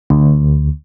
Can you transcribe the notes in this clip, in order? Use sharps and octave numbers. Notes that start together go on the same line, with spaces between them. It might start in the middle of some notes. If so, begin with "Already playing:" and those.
D2